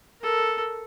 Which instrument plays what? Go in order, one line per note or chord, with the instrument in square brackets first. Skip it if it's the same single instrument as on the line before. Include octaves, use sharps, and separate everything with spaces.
[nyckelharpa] A4 A#4